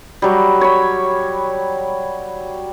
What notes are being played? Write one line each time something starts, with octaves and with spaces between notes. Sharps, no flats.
F#3 G3
C#5 B5